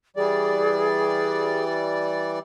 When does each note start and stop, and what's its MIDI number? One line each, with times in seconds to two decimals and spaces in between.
0.16 2.39 52
0.16 2.39 55
0.16 1.64 68
0.16 2.39 74